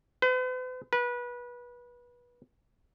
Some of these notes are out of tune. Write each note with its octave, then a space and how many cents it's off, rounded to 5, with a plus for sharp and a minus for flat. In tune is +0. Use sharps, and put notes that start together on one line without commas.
B4 +45
B4 -25